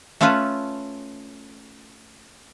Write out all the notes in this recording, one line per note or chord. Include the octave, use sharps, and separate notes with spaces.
A3 C#4 F4 A4 B4